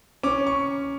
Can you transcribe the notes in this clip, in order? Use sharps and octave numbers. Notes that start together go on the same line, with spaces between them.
C#4 D6
C#6